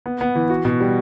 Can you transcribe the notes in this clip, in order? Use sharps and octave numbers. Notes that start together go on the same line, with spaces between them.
B3
B3
E3
F#4
B2
G3